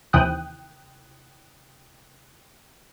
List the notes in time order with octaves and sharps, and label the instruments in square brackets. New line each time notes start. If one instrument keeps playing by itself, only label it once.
[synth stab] D#2 C3 E3 G5 D#6 F#6